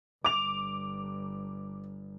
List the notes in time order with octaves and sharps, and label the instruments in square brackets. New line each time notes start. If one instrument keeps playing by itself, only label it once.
[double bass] G1 [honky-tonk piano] D6 F7